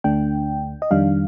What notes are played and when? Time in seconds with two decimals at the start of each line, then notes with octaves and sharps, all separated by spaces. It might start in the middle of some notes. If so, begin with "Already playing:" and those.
0.04 D2 D3 A3 D4 G5
0.82 D#5
0.91 F2 D#3 G3 D4 F5